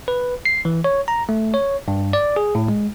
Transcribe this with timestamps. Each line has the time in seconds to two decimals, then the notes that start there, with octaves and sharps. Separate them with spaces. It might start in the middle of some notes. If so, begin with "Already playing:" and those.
0.08 B4
0.45 C7
0.65 E3
0.84 C#5
1.08 A#5
1.29 A3
1.54 C#5
1.88 G2
2.13 D5
2.36 G#4
2.55 A2
2.68 G#3